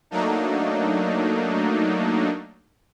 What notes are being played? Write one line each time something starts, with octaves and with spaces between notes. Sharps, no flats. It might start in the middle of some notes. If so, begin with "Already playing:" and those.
F#3 A3 A#3 D4 D#4